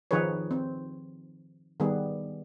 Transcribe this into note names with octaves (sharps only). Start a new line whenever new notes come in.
D#3 F3 D#4 G#4 B4 C#5
C4
D#3 G3 B3 G#4